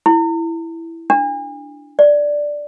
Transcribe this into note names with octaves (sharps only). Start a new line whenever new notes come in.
E4
D4
D5